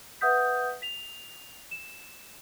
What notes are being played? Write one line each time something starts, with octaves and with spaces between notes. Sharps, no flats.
B4 E5 F#5 D#6 G6 B6
B6 F7
E7